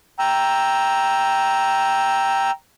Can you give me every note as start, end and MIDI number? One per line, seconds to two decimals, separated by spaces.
0.19 2.51 79
0.19 2.51 82
0.19 2.51 88